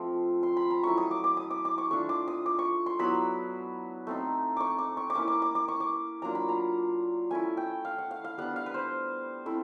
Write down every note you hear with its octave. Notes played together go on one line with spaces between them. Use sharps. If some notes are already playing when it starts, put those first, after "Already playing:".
Already playing: F3 A3 C4 F4
C6
B5
A#5
F#3 A3 C#4 E4 C#6
D#6
D6
D6
D#6
D6
D6
C#6
A3 D4 F4 C#6
D6
D#6
D6
C#6
C6
F#3 B3 E4 B5
A3 C4 D#4
C#6 D6
D6
C#6
D6
A#3 C#4 E4 C#6
D6
D6
D6
C#6
D6
F#3 A#3 D4 F4 A#5
B5
A#5
A3 C#4 E4 G#5
G5
F5
F#5
F5
F5
G3 B3 D4 F#5
F5
B4
C5
A3 C4 E4